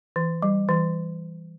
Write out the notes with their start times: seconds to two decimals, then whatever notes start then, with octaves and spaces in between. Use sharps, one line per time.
0.16 E3
0.42 G3
0.69 E3